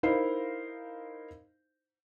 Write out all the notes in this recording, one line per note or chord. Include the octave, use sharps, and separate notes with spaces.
D#4 E4 A#4 C5 F5